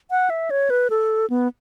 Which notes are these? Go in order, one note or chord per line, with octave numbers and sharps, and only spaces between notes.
F#5
E5
C#5
B4
A4
B3